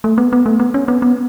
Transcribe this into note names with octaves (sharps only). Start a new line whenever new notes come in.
A3
B3
B3
A3
B3
C#4
B3
B3